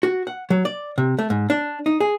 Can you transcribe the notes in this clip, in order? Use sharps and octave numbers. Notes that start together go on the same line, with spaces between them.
F#4
F#5
F#3
D5
C3
A3
G#2
D4
D#4
G#4